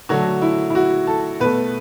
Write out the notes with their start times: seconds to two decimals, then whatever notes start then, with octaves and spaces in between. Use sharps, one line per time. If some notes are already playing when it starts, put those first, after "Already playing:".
0.09 D3 F#3 A3 F#4
0.42 E4
0.70 E4
0.75 F#4
1.07 A4
1.40 B2 A3 B4